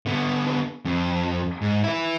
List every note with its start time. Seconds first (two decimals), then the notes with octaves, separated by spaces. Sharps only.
0.06 D3 B3
0.85 F2
1.62 G#2
1.84 E4 B4